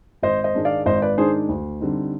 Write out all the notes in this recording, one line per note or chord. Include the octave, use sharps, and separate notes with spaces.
G#1 C5 D#5
C5 D#5
G#2 D#3 G#3 D4
D5 F5
G#1 C5 D#5
B4 D5
G#2 D#3 G#3 D4 G#4 C5
D2
D3 G3 C4 D#4